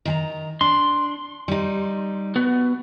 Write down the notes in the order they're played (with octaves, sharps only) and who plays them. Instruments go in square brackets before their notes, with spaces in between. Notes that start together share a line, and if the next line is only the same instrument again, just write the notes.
[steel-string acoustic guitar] D#3 G5 A#5
[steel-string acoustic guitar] D4 [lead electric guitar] C6
[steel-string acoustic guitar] G3 D#4
[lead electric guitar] B3 F#4